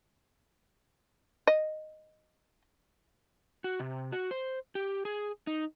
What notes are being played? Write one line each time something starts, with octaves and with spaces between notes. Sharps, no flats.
D#5
F#4
C3
F#4
C5
G4
G#4
D#4